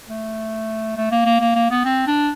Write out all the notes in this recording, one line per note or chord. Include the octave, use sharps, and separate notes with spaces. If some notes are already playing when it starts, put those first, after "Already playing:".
A3
A3
A#3
A#3
A#3
A#3
B3
C4
D4